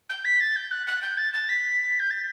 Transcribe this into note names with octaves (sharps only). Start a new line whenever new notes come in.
G6
B6
A6
G6
F#6
F#6
G6
A6
A6
B6
G6
A6